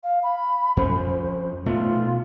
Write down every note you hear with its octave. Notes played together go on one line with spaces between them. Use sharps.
F5
B5
F2 C#4 C5
B2 A3 B3 F4